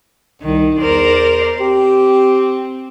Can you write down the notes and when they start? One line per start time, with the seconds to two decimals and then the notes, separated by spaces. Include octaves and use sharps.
0.42 C2 D#3
0.79 E2 A#4 C5 D5
1.60 C4 G4